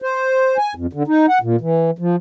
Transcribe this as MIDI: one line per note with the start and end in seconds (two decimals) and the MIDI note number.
0.02 0.57 72
0.58 0.74 80
0.75 0.86 41
0.93 1.03 50
1.07 1.26 63
1.29 1.39 78
1.42 1.56 46
1.61 1.91 52
1.99 2.16 53